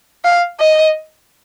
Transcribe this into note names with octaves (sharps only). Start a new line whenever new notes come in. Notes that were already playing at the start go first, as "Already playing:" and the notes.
F5
D#5